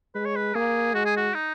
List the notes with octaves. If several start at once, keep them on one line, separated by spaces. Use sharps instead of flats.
G#3 B4
C#5
B4
A#3 G#4
G#3 F#4
G#4
F#4
D#4